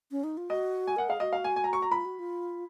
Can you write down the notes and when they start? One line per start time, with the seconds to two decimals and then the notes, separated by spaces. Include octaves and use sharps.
0.11 C#4
0.24 D#4
0.37 F4
0.50 F#4 D#5
0.87 G#5
0.96 A#4 F#5
1.09 G#4 F5
1.20 F#4 D#5
1.33 F5
1.44 G#5
1.56 G#5
1.64 A#5
1.73 C#6
1.82 A#5
1.91 F4 B5
2.05 F#4
2.19 F4